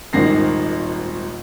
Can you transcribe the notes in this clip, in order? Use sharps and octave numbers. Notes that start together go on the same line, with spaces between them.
D#1 G#1 D#3 A#6 C7